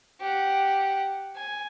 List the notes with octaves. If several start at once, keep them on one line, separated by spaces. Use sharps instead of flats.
G4 F#5
G#5